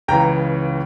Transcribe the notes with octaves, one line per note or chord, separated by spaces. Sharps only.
C#2 C#3 E3 G5 A#5